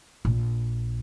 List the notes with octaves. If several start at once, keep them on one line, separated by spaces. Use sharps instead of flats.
A#1